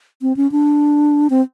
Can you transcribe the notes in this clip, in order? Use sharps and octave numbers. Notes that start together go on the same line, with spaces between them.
C4
C#4
D4
C4